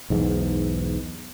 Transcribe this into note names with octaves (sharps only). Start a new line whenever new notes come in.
B1 E2 G#2